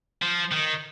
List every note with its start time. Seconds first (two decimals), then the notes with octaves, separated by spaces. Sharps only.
0.22 F3
0.51 D#3